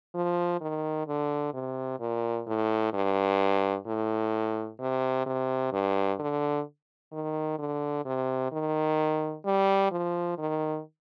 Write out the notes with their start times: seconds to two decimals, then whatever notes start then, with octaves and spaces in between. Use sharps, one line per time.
0.15 F3
0.61 D#3
1.07 D3
1.54 C3
2.00 A#2
2.47 A2
2.93 G2
3.86 A2
4.80 C3
5.26 C3
5.72 G2
6.19 D3
7.12 D#3
7.59 D3
8.05 C3
8.52 D#3
9.45 G3
9.91 F3
10.38 D#3